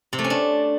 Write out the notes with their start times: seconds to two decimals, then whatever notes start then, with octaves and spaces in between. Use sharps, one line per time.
0.13 C3
0.19 A3
0.24 C#4
0.30 D4